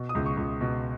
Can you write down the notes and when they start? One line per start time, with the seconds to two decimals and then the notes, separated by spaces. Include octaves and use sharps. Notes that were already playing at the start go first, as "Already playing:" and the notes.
Already playing: B2
0.09 D#6
0.15 C#2
0.26 C#6
0.37 C#2
0.61 B2